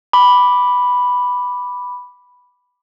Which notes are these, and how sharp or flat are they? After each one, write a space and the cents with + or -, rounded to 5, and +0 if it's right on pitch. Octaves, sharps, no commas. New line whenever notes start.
B5 +0 D6 +0